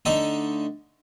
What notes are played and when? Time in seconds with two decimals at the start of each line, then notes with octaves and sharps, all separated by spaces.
0.05 D3 A3 D#4 A4